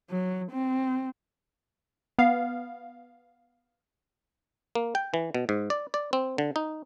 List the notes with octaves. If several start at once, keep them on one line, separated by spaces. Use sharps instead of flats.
F#3
C4
B3 F5
A#3
G5
E3
B2
G#2
D5
D5
C4
D3
D#4